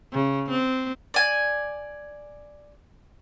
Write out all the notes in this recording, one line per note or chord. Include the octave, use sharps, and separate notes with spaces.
C#3
C4
D5 G#5